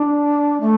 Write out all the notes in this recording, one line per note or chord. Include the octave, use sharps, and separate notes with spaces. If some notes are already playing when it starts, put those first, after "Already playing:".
Already playing: D4
A3